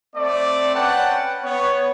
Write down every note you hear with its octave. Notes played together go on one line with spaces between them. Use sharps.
A3 C4 D5
C#4 B4 F#5 G5 A5
B3 C#5